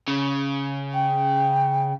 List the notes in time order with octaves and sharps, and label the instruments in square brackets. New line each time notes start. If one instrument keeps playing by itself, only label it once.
[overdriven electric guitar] C#3
[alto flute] G5